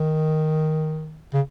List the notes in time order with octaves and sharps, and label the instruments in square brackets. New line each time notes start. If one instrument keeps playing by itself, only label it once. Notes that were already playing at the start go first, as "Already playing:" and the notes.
Already playing: [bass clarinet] D#3
C#3